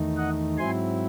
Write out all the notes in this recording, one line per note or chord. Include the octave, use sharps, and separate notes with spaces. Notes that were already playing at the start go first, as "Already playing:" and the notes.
Already playing: E2 D#3 A3 D#4
D#5 F#5
G#2 F#3 C4 E4 G#5 C6